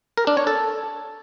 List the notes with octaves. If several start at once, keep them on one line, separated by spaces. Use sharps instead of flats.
A#4
D4
C#5
A4